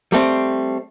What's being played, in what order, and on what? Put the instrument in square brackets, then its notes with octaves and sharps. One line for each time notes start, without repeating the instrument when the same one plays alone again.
[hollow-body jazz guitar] G3 A3 C4